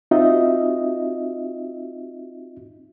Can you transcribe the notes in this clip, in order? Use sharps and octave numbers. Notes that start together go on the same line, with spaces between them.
C4 D#4 F4 F#4 D#5 E5